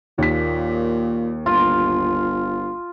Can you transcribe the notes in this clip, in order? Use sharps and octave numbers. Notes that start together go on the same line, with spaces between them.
D#2 A#2 B6
G1 F4